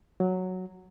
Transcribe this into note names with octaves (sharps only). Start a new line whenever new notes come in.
F#3